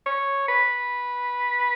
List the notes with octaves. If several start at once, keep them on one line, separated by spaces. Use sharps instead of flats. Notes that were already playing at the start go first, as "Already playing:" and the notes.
C#5
B4